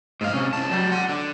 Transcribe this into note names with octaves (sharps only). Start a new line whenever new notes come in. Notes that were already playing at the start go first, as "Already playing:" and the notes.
G#2 F5
C3 C#4
C2 A5
F#3 G3
F#5 C6
D3